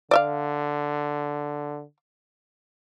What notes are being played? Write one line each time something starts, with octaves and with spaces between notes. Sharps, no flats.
D3 D5 E5 F5